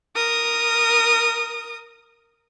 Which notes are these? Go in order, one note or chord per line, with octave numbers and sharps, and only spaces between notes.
A#4 D#6